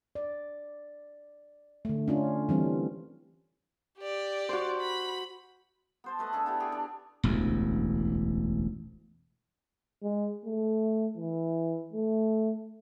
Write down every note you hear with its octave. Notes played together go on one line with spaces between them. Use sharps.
D5
D3 A3
C#4 D4 F4
E3 G3 C4
G4 D5
F#4 C5
B5
B3 C5 A5
A3 B4 D#5
D4 G#4 A4
B3 E4 G4
G4 G#4 C#6
D4
E1 A1 D2
G#3
A3
E3
A3